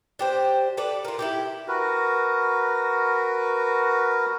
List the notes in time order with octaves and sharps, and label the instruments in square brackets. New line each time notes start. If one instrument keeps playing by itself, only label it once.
[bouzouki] D4 G4 C5
A4 B4 D5
F4 A#4
E4 F#4 G4
[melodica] F#4 A#4 B4